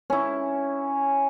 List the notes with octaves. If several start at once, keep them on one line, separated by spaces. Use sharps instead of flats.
C#4 E4